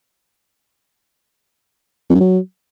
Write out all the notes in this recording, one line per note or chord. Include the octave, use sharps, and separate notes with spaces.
F2
F#2
F#3